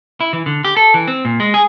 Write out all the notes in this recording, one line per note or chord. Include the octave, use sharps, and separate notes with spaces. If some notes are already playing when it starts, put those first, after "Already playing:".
E4
E3
D3
G4
A4
E3
C4
A#2
G#3
G#4